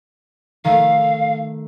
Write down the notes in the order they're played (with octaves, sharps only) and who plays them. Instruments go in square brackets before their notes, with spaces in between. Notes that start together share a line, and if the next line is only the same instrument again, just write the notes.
[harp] D#3 A3 [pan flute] F5